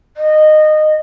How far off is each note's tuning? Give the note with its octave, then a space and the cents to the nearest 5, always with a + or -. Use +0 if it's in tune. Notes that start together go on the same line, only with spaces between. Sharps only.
D#5 -15